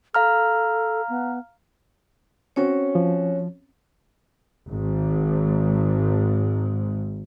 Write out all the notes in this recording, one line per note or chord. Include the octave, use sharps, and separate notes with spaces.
A4 F5 A#5 F6
B3
C4 C#4 F#4 C#5
F3
G#1 G#2